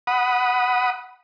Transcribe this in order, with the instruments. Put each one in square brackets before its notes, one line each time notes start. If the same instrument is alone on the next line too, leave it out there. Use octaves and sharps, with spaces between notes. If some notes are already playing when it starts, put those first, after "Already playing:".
[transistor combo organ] F#5 B5 D#6